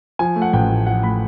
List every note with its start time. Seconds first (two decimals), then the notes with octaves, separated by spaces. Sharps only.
0.19 F3 G#5
0.36 A3
0.42 F#5
0.53 A1 G5
0.70 A2
0.86 F3 F#5
1.03 A3 B5